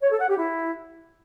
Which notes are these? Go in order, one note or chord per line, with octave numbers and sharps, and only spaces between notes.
C#5
A4
F#5
G4
E4